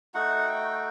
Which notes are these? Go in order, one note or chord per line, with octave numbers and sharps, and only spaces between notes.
A3 D#4 F#4 F#5
G5